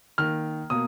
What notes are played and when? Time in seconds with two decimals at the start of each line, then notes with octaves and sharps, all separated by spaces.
0.18 D#3 A#3 F6
0.70 B2 A#3 D#6